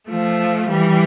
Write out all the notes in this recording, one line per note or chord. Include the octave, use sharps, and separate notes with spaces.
F3 A3
E3 G3